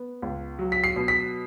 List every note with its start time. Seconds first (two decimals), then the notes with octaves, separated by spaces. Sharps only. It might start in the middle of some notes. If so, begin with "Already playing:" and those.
Already playing: B3
0.22 C#2
0.59 F#3
0.72 B6
0.84 C7
0.96 B2
1.08 B6